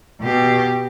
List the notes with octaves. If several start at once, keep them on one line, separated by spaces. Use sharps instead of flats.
B2 G4